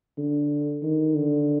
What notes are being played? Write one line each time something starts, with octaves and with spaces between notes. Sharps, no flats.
D3
D#3
D3